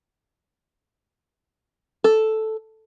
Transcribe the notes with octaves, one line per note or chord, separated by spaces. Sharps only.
A4